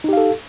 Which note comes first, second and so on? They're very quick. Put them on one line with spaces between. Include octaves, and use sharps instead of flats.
D#4 G4 F5 A4